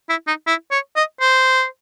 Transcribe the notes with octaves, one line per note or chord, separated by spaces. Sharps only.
E4
D#4
E4
C#5
D#5
C5